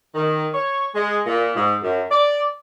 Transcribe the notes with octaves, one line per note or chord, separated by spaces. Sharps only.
D#3
C#5
G#3
A#2
G#2
F#2
D5